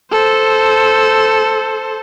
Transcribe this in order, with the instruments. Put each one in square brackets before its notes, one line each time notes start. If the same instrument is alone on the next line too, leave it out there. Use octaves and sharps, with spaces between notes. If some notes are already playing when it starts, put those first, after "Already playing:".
[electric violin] A4 C5